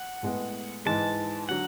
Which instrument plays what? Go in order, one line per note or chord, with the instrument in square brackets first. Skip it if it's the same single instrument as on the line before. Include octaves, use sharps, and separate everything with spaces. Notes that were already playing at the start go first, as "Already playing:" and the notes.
Already playing: [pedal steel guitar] F#5
[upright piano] A2 G#3 B3
[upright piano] G#2 E3 G#3 [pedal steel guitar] A5
[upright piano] D3 F#3 [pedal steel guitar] F#5